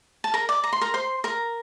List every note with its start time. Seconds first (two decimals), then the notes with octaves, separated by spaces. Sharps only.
0.24 A5
0.34 A#4 A#5
0.49 D5
0.64 A#5
0.73 C6
0.81 A#4 A#5
0.94 C5 C6
1.24 A#4 A#5